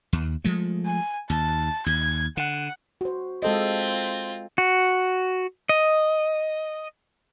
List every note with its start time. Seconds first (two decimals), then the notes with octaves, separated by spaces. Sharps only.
0.13 D#2
0.44 F3 G#3 A3
0.85 G#5
1.30 D#2 A5
1.86 D#2 G#6
2.37 D3 F#5
3.01 F#4 C5
3.43 G#3 C4 F4 A4 D#5
4.58 F#4
5.69 D#5